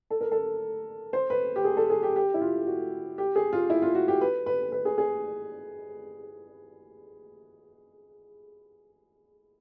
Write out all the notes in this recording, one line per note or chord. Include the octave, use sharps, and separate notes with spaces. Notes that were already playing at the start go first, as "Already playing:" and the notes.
A4
A#4
A4
C5
B4
G4
G#4
A4
G#4
G4
G4
E4
F4
F#4
G4
G#4
F4
E4
F4
F#4
G4
B4
B4
B4
G#4
G#4